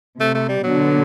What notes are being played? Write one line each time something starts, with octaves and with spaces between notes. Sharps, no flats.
C3 A3
A3
G3
B2 D3 F#3